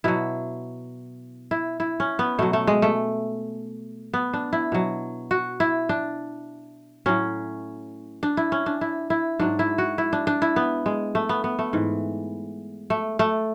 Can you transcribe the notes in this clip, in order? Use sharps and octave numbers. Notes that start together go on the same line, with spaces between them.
B2 F#3 E4
E4
E4
C#4
B3
B2 F#3 A3
A3
G#3
A3
B3
D4
E4
B2 F#3
F#4
E4
D4
A2 F#3 C#4
D4
E4
C#4
D4
E4
E4
G#2 F#3 D4
E4
F#4
E4
D4
D4
E4
B3
G#3
A3
B3
B3
A3
G#2 E3
A3
A3